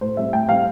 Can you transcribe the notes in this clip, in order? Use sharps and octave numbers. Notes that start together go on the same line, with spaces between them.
A2 C5
G3 C4 E5
A2 G5
G3 C4 F5